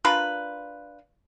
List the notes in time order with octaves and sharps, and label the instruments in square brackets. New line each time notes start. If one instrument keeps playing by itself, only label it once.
[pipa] D4 F4 A#4 B4